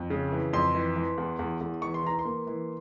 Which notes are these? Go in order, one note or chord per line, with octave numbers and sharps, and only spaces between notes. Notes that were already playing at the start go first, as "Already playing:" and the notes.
Already playing: F2
C#3
E3
F2 C6
E3
E3
E2
E2
E2
E3 C#6
C6
E3 A#5
C6
A#3
E3